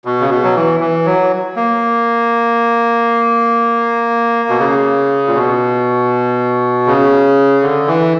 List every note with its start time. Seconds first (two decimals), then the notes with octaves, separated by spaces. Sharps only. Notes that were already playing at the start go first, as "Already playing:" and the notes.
0.05 B2
0.20 C#3
0.29 B2
0.44 F#3
0.55 E3
0.80 E3
1.05 F#3
1.56 A#3
4.49 B2
4.59 C#3
5.27 A#2
5.35 B2
6.86 C#3
7.62 D3
7.87 E3